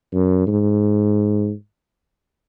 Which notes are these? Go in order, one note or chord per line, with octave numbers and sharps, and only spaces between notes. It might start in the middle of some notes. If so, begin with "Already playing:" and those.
F#2
G#2